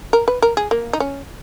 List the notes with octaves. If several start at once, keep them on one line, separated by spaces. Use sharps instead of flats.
A#4
B4
A#4
G#4
A#3
D#4
C#4